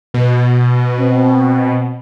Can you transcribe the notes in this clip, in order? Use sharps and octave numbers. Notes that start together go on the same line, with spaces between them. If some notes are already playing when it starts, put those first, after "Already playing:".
B2
C4